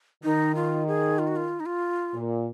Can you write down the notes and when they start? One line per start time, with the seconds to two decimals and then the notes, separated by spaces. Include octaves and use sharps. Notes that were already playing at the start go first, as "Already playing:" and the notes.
0.24 D#3 D#4
0.55 F4
0.87 G#4
1.19 F4
1.28 F#4
1.36 F4
1.60 D#4
1.66 F4
2.14 A#2